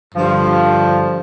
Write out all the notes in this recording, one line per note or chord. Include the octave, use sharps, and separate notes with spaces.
G2 D3 F3